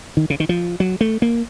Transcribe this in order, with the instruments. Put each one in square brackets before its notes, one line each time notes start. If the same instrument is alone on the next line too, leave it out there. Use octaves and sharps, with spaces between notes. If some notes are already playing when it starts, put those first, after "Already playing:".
[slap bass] D#3
C#3
D#3
F3
F#3
A3
A#3